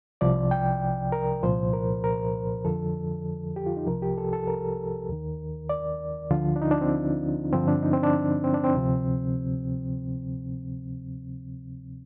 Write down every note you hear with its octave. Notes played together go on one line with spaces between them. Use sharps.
C2 C3 F3 D5
G5
A#4
C2 A#2 F3 C5
A#4
A#4
F2 D3 F3 A4
G4
F4
D#4
C2 C3 F3 A#4
G4
A4
A4
A#4
D#2 D#3
D5
D2 D3 F3 F4
D4
D#4
D4
C4
G2 D3 F3 C4
D4
D#4
C4
D4
C4
D4
C4
D2 C3 F3